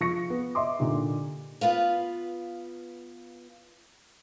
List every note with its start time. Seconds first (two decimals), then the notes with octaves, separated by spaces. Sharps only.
0.01 F3 C#6 A#6 C#7
0.30 B3
0.55 D#5 E5 C6 D6
0.79 A#2 D3 G3 D#4
1.61 B3 F4 B4 F5